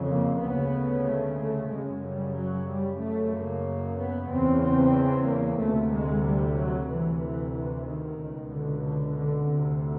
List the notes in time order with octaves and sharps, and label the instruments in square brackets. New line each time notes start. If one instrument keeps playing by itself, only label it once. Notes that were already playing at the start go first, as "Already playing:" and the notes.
Already playing: [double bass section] F2 C#3
A#3
D2 C#3 B3
A3
A3
F#2 C#3 G#3
G3
F#3
G3
F#2 C#3 A3
A#3
B3
E2 C#3 C4
C4
A#3
D2 C3 A3
G#3
G3
F#3
D2 C3 E3
E3
E3
D#3
C#2 B2
D3
D3
D3
D2 C3